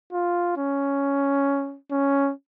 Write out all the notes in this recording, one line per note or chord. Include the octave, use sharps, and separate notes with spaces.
F4
C#4
C#4